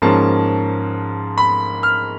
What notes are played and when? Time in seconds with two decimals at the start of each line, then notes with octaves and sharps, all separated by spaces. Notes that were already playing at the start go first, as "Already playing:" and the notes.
0.02 G#2 F3 A#3 C#4 A5
1.38 B5
1.83 F6